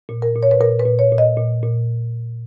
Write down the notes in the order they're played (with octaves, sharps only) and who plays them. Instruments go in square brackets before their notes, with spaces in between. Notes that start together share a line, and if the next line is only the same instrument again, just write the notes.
[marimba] A#2
A#4
A#2
C#5
B4
A#2 A#4
B4
A#2
C#5
A#2
D#5
A#2
A#2